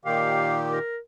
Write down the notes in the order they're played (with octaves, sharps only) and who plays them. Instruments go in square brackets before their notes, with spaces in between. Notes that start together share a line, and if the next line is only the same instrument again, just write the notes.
[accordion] A#2 D#3 G4 [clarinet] F5
[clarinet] A#4